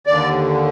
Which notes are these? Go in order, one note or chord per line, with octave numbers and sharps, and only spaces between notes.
D#2 D3 D5